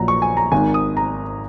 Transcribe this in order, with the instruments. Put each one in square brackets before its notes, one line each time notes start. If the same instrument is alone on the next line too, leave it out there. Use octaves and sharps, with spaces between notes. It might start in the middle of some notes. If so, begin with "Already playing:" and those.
Already playing: [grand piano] A#1 A#2 F#3 A#5
C#6
G#5
A#5
G#1 G#2 D#3 G#5
D#6
A#5